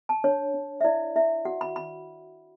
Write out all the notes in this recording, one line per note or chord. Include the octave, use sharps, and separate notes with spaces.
A5
D4 C#5
D4
E5
E4 D5
E4 E5
F#4 F#5
B5
B5